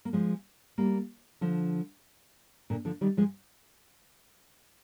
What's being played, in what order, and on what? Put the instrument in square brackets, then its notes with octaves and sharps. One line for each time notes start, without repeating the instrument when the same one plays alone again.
[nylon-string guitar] A#3
F3 G#3
G3 A#3
D3 F3
A#2 D3
D3 F3
D#3 G3
F3 G#3